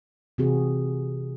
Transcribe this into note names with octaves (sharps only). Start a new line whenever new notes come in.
C3 E3 C4 F#4 G#4